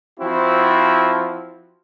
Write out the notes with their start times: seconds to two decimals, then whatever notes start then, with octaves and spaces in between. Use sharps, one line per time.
0.19 F3 C4 E4 F#4